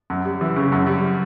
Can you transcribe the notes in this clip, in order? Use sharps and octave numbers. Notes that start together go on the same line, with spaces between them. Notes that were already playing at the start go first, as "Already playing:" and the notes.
F#2
G3
E3
C#3
F#2
G3